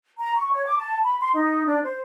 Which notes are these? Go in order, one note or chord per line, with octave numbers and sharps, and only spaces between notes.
A#5
C#6
C#5
D6
A5
B5
C6
D#4
D4
C5